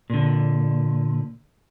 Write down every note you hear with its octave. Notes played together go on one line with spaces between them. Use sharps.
A#2 D3